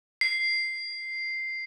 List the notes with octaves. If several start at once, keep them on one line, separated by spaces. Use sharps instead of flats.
C7